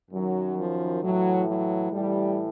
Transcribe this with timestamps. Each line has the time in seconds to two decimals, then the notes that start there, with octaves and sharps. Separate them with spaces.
0.11 F#2 D#3 F#3
0.56 F3
1.02 A2 E3 F#3
1.46 F#3
1.92 A2 E3 G3